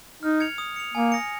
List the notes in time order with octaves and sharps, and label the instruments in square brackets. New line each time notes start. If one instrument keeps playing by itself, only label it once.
[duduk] D#4 [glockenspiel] F6
[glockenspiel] G#6 C#7 F7
D#6
C#7 F7
[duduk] A#3 [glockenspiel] G#5
[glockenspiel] D#6 A#6 C#7